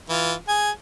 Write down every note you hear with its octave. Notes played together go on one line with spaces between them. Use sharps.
E3 F4
G#4 G#5